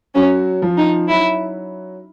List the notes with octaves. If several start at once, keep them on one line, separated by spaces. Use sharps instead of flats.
F#3 C#4 F#4
F3 F4
D#4
F#3 E4 F#4